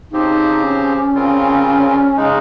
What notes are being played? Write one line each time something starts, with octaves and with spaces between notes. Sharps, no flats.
C#3 F3 C4 D#4 G4 C5
C#4
C#3 G3 C4 F4 A#4
C#3 G#3 D#4